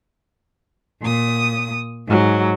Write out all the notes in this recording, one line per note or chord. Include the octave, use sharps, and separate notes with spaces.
A#2 D#6
G#2 F#3